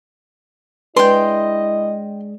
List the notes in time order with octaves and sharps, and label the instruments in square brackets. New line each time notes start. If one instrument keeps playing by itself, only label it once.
[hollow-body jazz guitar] G#3 D4 G#4 [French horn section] E4 D#5 [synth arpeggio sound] B4 [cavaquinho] G5 C6